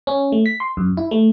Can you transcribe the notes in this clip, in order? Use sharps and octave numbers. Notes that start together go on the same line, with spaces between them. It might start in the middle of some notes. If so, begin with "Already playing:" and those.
C#4
A3
B6
C6
F#2
E4
A3